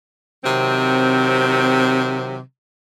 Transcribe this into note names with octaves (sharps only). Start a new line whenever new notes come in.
C3 D#3 F#3 C4